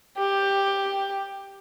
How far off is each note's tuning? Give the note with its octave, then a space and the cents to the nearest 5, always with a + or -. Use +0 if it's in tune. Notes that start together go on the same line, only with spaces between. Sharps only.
G4 +5